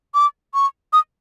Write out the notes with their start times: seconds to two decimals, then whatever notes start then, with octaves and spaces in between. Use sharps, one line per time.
0.15 D6
0.54 C#6
0.93 D#6